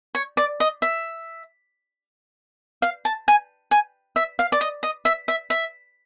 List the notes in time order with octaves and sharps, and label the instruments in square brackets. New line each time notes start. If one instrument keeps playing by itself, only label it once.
[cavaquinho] C#5
D5
D#5
E5
F5
A5
G#5
G#5
E5
F5
D5
D#5
D#5
E5
E5
E5